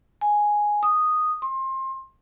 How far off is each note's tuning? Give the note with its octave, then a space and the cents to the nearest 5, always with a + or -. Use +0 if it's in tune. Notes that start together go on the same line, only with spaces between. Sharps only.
G#5 +0
D#6 -5
C6 +25